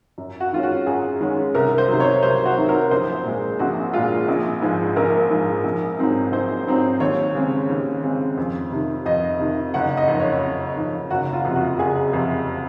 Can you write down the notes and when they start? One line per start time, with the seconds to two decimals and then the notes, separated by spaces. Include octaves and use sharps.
0.18 F#2
0.40 F#4
0.52 D#3 G#3 C#4 F4
0.63 F#4
0.86 F#2 G#4
1.20 D#3 G#3 C#4
1.55 C2 A#4
1.78 C5
1.88 C3 D#3 F#3
2.00 C#5
2.23 C2 C5
2.45 F#4
2.57 C3 D#3 F#3
2.69 A#4
2.91 A#1 C5
3.25 A#2 G#3
3.59 A#1 F#4
3.93 A#2 G#3 F4
4.28 A#1
4.62 G#2 F3 G#3
4.96 A#1 A#4
5.30 G#2 F3 G#3
5.64 A#1
5.98 G#2 F#3 C4 D#4
6.32 A#1 C5
6.66 G#2 F#3 C4 D#4
7.00 D#2 C#5
7.35 C#3 G#3 C4
7.69 D#2
8.03 C#3 G#3 C4
8.37 F2
8.72 C3 D#3
9.05 F2 D#5
9.39 C3 D#3
9.74 F#1 F#5
9.97 D#5
10.07 F2 D#3
10.20 C#5
10.43 F#1
10.77 F2 D#3
11.10 F#1 F#4
11.33 F4
11.45 F2 C3
11.56 F#4
11.78 F#1 G#4
12.13 F2 C3